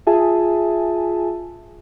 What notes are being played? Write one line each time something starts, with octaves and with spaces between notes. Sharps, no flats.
F4 G#4 E5 G#5 A5